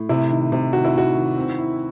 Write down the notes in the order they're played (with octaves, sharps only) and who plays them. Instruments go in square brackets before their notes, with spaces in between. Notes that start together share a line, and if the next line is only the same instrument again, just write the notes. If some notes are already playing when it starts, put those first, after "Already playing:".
Already playing: [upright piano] A2
[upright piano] C3 [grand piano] E4
[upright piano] D#3
C3
[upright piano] D#3 [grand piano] F#4
[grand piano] E4
[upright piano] D#3 [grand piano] F#4
[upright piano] D#3
C4
E4